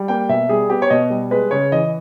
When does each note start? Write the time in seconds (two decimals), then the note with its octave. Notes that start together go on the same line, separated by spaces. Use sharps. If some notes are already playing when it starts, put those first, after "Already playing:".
Already playing: G3
0.08 A#3 G5
0.29 B2 E5
0.49 G3 G#4
0.70 B3 G4
0.82 C#5
0.90 B2 D#5
1.10 G3
1.31 G#3 B4
1.51 C#3 C#5
1.72 E3 D#5